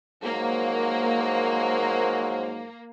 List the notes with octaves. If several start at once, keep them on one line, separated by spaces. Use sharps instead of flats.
G#2 F3 F#3 A#3